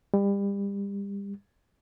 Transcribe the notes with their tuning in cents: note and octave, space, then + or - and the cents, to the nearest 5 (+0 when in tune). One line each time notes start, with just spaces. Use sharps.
G3 +30